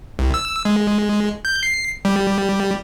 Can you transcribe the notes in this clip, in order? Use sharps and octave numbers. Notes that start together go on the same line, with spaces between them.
C2
E6
G#3
G6
C7
G3